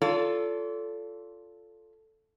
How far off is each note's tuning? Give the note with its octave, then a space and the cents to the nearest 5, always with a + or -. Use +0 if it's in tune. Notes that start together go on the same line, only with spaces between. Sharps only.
F4 +0 A4 +0 D5 -45